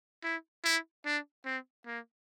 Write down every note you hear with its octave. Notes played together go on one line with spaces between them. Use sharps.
E4
E4
D4
C4
A#3